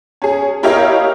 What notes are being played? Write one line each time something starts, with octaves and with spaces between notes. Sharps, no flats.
C#4 G#4
E4 G4 A#4 C#5 D#5 F5